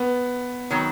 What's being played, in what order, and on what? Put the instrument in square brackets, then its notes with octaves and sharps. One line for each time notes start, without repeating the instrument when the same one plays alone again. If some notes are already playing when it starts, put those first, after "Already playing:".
Already playing: [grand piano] B3
[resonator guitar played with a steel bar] D#3 F#3 B3